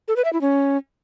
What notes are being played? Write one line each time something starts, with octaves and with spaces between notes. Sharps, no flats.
A4
B4
E5
E4
C#4